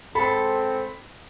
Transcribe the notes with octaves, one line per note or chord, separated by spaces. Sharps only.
G#2 C4 A4 B5